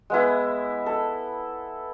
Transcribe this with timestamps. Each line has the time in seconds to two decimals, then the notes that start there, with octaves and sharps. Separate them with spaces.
0.10 G#3 B3 E4
0.86 A4